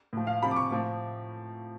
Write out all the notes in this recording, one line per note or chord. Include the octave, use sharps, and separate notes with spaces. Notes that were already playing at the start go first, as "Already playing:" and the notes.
A2 F3
F5
C3 F3 B5
D6
C#6
A2 F3